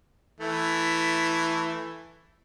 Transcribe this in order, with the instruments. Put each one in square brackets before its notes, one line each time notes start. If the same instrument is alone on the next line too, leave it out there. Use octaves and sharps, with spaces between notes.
[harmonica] E3 A3